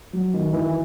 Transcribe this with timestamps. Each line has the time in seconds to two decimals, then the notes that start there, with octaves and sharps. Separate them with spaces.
0.13 F#3
0.34 D#3
0.53 E3